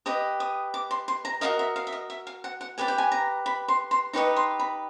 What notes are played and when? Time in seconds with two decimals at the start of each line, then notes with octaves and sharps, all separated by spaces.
0.06 G4 B4 D#5 D#6
0.40 D#6
0.74 D6
0.91 C6
1.08 C6
1.25 A#5
1.41 F#4 A#4 D#5 F5
1.59 E5
1.76 F5
1.87 E5
1.92 D#5
2.10 E5
2.27 F5
2.44 F#5
2.61 F#5
2.78 G4 B4 D5 G#5
2.88 G5
2.98 G#5
3.12 A#5
3.46 B5
3.68 C6
3.91 C6
4.13 D#4 G4 B4 D#5 C#6
4.37 C6
4.60 B5